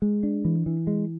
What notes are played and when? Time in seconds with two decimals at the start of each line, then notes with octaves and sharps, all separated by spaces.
0.02 G#3
0.23 D4
0.45 E3
0.66 E3
0.87 G#3